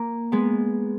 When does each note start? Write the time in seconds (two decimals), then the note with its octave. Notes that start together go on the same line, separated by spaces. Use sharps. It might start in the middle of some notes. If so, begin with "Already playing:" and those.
Already playing: A#3
0.32 G#3 B3